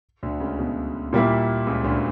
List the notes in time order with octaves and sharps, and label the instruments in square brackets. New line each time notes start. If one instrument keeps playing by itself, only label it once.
[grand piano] D2 D3
C#2 C#3
B2
[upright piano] A#2 G3 A#3 E4
[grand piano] C#2 C#3
D2 D3